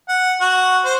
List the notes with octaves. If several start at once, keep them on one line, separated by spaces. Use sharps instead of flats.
F#5
F#4
C5